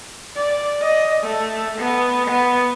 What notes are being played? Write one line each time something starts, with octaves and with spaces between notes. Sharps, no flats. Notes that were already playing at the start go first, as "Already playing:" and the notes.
D5
D#5
A3
B3
B3